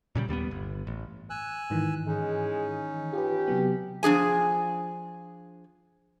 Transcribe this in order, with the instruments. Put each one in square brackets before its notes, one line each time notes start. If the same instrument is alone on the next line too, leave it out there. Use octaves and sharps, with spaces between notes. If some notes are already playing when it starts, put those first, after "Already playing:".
[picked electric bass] A#2 C#3 F#3 G3
D#2 G3 A#3 B3
G1
A1
[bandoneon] G#5 E6 F#6
[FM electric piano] G#2 D#3 E3
[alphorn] G#3 [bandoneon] C#4 D#4
[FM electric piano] F4 B4 [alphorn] G4
[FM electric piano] C3 F#3 B3
[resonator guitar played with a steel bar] F3 D4 G#4 G#5